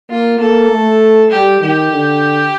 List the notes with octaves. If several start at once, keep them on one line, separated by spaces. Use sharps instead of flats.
A#3 F4
A#3 A4
A3
G3 G4
D#3 G4
D3